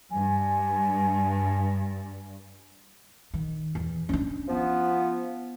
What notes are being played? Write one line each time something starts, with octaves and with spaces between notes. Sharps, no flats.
G2 G#5
D#3
E2
C#4 D4
F3 B3